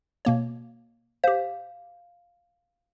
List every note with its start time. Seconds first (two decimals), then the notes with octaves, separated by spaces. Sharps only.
0.25 B2 A#3 C#5
1.24 G4 C5 F5